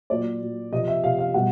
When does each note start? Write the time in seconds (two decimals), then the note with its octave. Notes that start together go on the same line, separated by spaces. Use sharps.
0.10 A#2 F#3 D5
0.41 A#2 F#3
0.72 C3 F3 D#5
0.88 E5
1.03 C3 F3 F5
1.19 F5
1.34 B2 G3 F#5